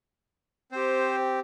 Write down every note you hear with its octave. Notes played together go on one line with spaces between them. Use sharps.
C4 G4 C5